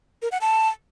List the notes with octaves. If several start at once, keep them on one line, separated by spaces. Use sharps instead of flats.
A#4
F#5
A5